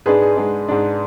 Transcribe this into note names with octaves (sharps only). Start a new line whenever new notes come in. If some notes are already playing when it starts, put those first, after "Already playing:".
G#2 G#3 D4 G#4 B4
G#4
G#2 G#3 D4
G#2 G#3 D4